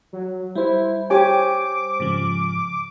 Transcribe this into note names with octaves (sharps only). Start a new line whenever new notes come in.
F#3
G3 E4 C5
G4 C#5 G#5 D6
G#2 C#3 F3